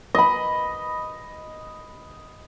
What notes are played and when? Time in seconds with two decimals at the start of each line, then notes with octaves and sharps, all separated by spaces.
0.15 D#5 B5